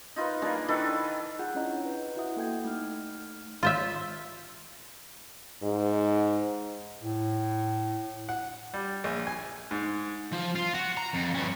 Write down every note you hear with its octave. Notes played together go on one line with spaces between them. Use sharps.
D#4 F4 A#4 B4
A#3 D4 G#4 A#4
D#3 E3 A4 B4
F4 G#4 F#5 F#6 G6
C#4 D4 E4 C#5 D#5 A#5
B4 G6
E4 F#4 E5 F#5 D#6
A#3 A4 G5 G6 G#6
A3 D#4 F6
F4 C5 E5
G#2
A2
F#5
G3
A#1
G#5
G#2
F3
F4
F#4
A#5
F2
G2 C#4